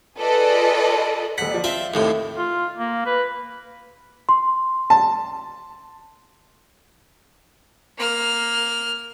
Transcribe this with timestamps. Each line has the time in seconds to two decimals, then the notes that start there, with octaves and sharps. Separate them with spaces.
0.19 F4 G#4 A4 B4 D5 D#5
1.38 D#1 F#5 B6
1.51 F3 D5
1.64 C4 F4 E5 A5
1.94 D#2 A2 C3
2.37 F4
2.77 A#3
3.06 B4
4.29 C6
4.90 A5
7.98 A#3 F6